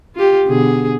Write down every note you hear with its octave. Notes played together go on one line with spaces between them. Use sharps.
F4 G4
B2 D3 G#4